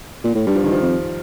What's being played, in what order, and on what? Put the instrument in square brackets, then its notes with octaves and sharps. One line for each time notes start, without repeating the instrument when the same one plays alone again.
[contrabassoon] A#2
A2
[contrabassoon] G2 [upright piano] G3
[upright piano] F3
[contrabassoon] G2 [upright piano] D#3
[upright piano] F3
[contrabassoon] F2